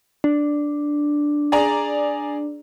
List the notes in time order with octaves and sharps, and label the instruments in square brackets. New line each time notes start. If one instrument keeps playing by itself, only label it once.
[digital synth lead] D4
[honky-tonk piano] G#4 D5 A#5